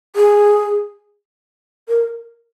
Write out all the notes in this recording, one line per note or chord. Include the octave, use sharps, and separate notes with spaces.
G#4
A#4